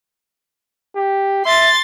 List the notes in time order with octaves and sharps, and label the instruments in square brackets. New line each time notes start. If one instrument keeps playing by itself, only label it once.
[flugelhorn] G4
[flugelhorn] E5 [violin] C6 A6